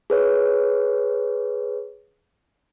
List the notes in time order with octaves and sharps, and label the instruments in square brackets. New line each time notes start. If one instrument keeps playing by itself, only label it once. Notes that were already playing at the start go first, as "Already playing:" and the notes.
[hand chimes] G#4 B4 C#5